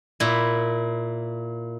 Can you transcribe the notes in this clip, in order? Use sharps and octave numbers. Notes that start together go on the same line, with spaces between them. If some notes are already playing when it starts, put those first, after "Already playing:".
A#2 E4